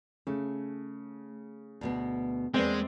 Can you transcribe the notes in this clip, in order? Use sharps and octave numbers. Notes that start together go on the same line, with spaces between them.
C#3 A3
D2 B2 B3
E2 G#3 A#3 C4 B4 D5